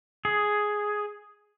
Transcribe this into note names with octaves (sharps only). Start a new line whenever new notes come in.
G#4